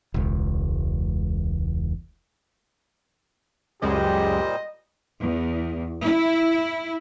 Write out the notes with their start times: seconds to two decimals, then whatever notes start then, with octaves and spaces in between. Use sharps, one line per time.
0.14 E1 C#2
3.82 C#2 F#2 A#2 G3 G#3 G4 C5 D#5
5.22 E2
6.03 E4